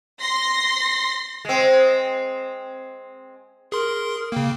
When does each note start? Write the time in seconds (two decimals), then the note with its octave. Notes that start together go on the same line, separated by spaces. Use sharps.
0.20 C6 A#6
1.45 G#3 C4
3.72 G#4 A#4 C6
4.32 C#3 A#3 G5